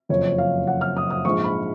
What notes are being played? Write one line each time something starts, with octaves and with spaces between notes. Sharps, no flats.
F#1 F2 F3 C#5
F5
F#5
F6
D#6
D#6
A#1 G#2 F3 G#3 C#6
B5